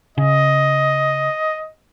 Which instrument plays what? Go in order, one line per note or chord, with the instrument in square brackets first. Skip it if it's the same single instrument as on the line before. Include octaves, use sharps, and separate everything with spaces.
[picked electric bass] C#3 [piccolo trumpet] D#5